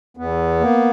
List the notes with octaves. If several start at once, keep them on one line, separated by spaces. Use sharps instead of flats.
E2 B3
A#3